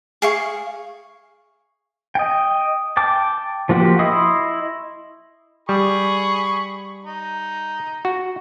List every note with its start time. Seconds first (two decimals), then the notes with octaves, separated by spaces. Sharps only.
0.22 G#4 F5 C#6
2.15 D#5 G5
2.97 G5 A5 D6
3.69 F3 A#3 F#4 G4 C5
3.99 E4 D#5 C6 C#6 D#6
5.69 G3 G#4 B5 C#6
7.05 D#4
8.05 F#4